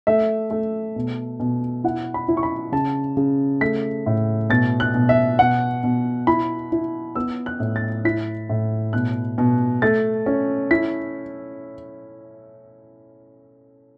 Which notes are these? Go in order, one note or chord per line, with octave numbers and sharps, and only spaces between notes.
A3 E5
A3
B2
B2
E4 F#5
B5
E4
C#6
B5
C#3 A5
C#3
A3 B6
A2
B2 A6
F#6
B2
E5
B2 F#5
B2
E4 B5
E4
B3 E6
F#6
A2
A6
E4 B6
A2
B2 F#6
B2
A3 A6
C#4
E4 B6